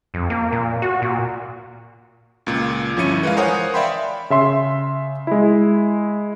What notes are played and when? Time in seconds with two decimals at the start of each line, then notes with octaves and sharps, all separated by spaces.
0.14 F2
0.30 A#3
0.52 A#2
0.82 F#4
1.02 A#2
2.46 C#2 A#2
2.97 G1 F3 C#4 E4 C#7 D#7
3.23 E3 G#3 A#4 F5
3.37 A#4 C5 C#5 F#5 G#5 D#6
3.74 D5 E5 F5 G5 B5 C6
4.30 C#3 E5 C6
5.27 G#3 E4